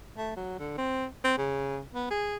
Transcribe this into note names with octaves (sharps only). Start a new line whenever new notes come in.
A3
F#3
D3
C4
C4
C#3
B3
G#4